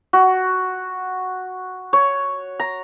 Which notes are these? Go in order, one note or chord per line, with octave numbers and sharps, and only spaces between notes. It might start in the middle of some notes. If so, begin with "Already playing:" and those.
F#4
C#5
A#5